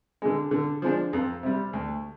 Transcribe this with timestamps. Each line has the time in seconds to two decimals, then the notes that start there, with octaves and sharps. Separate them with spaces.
0.22 D3 G#3
0.51 D3
0.82 F3 G#3 D4
1.13 F2
1.43 C3 G3
1.73 D2